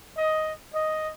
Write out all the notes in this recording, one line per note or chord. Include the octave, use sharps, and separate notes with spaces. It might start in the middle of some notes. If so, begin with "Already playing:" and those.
D#5
D#5